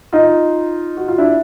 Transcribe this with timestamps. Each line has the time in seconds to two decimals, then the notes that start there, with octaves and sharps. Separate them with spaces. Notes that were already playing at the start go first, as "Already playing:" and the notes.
0.13 D#4 F4
0.97 F#4
1.08 F4
1.18 D4 E4